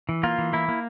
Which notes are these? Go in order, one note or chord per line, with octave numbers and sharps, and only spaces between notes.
E3
A#3 F4
E3
A#3 E4
A#3